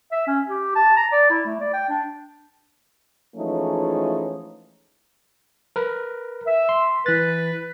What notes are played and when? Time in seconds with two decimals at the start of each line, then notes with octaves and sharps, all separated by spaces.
0.11 E5
0.27 C#4
0.47 G4
0.75 A5
0.96 A#5
1.12 D5
1.30 E4
1.46 A3
1.60 D5
1.73 G5
1.89 D4
3.36 E3 F3 G#3 A3 C#4 D#4
5.76 A#4 B4
6.47 E5
6.69 C6
7.06 E3 B4 A6